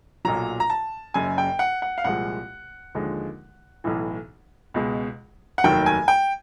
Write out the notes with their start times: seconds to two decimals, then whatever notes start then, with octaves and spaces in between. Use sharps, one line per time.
0.25 B1 A#2 F#3 A#5
0.60 A#5
0.70 A5
1.14 F#1 F#2 C#3 G#5
1.38 G5
1.59 F#5
1.82 F#5
1.98 F5
2.04 C2 A#2 F3 G#3 F#5
2.95 D#2 D3 F3 G#3
3.84 B1 A2 E3
4.74 C#2 B2 G#3
5.58 F#5
5.64 F1 D#2 D#3 F#3 G5
5.86 G#5
6.08 G5